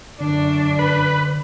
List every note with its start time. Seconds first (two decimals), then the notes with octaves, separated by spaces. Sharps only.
0.20 F#2 D3 D4
0.79 B4